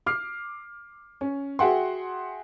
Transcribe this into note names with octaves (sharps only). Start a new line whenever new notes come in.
D6 F6 C7
C#4
F#4 G#4 E5 F#5 G5 C6